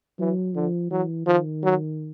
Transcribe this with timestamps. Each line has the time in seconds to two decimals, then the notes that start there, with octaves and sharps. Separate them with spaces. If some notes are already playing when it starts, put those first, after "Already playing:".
0.19 E3 F#3
0.55 D3 F3
0.91 E3 F#3
1.27 D#3 F3
1.63 F#3